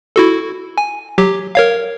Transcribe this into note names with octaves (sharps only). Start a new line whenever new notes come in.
E4 F#4 A4
G#5
F#3 G4
A#4 C#5 F5